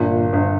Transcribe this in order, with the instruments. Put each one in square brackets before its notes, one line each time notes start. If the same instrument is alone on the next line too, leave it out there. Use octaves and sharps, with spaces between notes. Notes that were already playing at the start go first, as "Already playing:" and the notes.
Already playing: [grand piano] G1 [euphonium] A#2
[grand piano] G1